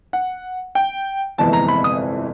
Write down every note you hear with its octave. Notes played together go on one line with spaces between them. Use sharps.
F#5
G5
G1 F2 C3 E3 G#3 A5
A#5
B5
D#6